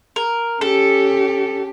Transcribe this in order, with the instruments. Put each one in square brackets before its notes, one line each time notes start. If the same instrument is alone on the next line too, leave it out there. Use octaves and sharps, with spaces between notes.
[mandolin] A#4
[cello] C#4 G4 [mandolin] A4